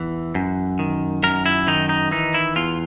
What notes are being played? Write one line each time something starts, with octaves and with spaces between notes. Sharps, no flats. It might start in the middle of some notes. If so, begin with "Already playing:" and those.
Already playing: E2 E3
F#2
D#3
F#2 A#4
E4
D#3 D#4
D#4
E3 D#4
E4
E2 F4